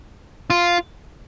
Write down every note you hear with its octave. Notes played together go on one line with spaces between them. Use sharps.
F4